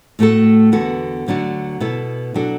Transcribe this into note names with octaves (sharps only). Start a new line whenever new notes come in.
A2 A3 F#4 A4
E2 D3 B3 F#4 A4
D2 D3 F#3 D4 F#4
B2 B3 E4 A4
B2 F#3 D4 F#4 A4